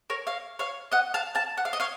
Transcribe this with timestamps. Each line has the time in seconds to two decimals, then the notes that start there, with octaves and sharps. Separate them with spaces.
0.10 A#4 C#5
0.27 C#5 F5
0.59 C#5 F5
0.92 D#5 F#5
1.14 F5 A5
1.35 F5 A5
1.57 F#5
1.65 F5
1.73 D#5
1.80 C#5 F5